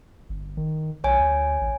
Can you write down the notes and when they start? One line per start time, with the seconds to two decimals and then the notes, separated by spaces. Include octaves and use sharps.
0.29 G1
0.57 D#3
1.04 B1 C#5 G#5
1.19 D2
1.61 A1